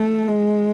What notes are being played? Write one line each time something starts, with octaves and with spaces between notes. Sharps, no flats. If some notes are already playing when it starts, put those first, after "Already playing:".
Already playing: A3
G#3